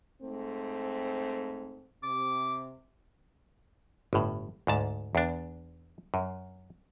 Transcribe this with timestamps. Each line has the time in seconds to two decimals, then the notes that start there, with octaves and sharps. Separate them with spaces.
0.22 G#2 A3 C4
2.03 C3 D6
4.13 G1 A2
4.67 D2 G#2 A5
5.15 E2 D4
6.14 F#2